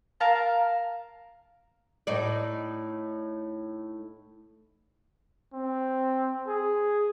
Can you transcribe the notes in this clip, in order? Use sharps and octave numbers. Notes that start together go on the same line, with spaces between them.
A#4 F5 A5 A#5
A2 D#4 D5
C4
G#4